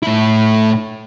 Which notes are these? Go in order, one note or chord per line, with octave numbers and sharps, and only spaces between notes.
A2 E4